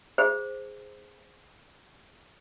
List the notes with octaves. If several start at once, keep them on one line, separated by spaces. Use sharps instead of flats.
G#4 C5